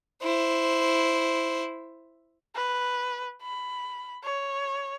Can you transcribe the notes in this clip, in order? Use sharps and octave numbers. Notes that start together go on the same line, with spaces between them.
E4 C5
B4
B5
C#5